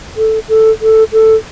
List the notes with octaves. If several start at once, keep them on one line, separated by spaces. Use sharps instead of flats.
A4
A4
A4
A4